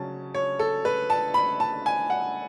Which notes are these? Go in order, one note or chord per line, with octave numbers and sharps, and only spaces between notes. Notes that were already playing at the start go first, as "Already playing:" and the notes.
Already playing: C#3 F#3 C#4 A5
C#5
A4
B4
A5
B5
A5
G#5
F#5